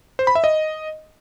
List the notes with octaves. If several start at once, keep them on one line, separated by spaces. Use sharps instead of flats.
C5
B5
E5
D#5